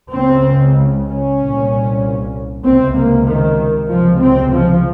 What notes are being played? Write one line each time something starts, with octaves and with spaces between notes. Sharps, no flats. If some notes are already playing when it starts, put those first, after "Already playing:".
C#2 C#3 C4
C#4
C2 A#2
C#2 C3 C4
A#3
D#3
C#2 C3 F3
C4
F3